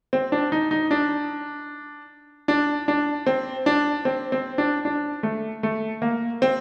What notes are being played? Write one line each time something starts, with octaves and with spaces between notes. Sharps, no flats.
C4
D4
D#4
D#4
D4
D4
D4
C4
D4
C4
C4
D4
D4
A3
A3
A#3
C4